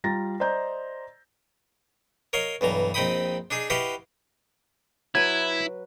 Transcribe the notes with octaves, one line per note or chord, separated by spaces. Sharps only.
G3 F4 A#5 A6 A#6
C5 D5 D#5 A#5 G6
A#4 C#5 D#5 F5
B1 G2 E3 A#5
A#1 C4 D#4 G5 B5 D#6
D4 D#4 G#4
E4 F#4 G4 B4 D#5 F5
F#3 E4 B4 G#6